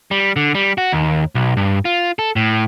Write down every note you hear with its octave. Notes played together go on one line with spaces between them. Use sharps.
G3
D3
G3
F#4
D#2
B1
G2
F4
A4
A2